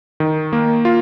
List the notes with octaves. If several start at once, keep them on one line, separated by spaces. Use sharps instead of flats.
D#3
A#3
F4